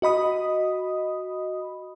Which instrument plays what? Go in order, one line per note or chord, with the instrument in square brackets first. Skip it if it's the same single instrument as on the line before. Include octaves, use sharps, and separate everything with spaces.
[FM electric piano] F#4 D#5 B5 D#6